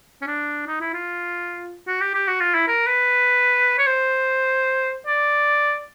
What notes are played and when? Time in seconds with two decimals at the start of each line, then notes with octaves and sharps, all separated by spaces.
0.22 C#4
0.27 D4
0.67 D#4
0.81 E4
0.93 F4
1.87 F#4
2.01 G4
2.14 G4
2.28 F#4
2.40 F4
2.55 E4
2.68 A#4
2.87 B4
3.79 C#5
3.87 C5
5.07 D5